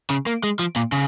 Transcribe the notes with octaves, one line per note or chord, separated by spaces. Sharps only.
C#3
A#3
G#3
F3
A#2
C#3